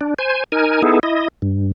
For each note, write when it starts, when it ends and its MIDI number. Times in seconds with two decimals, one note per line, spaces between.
0.01 0.14 62
0.19 0.44 72
0.19 0.44 80
0.52 0.82 63
0.52 0.82 70
0.52 0.82 80
0.83 0.99 59
0.83 0.99 63
0.83 0.99 64
0.83 0.99 68
0.83 0.99 69
1.03 1.28 64
1.03 1.28 75
1.42 1.72 43